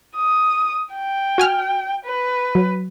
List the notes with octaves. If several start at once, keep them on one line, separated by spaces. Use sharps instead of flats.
D#6
G5
F#4 G#5 F6
B4
F#3